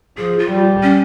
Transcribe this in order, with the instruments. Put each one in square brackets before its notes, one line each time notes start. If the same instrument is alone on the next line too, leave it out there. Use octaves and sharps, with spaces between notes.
[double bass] F3 [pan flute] G#4
[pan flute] F4
[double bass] G3
[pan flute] C#4